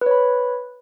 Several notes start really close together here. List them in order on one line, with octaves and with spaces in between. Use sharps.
B4 C#5 B5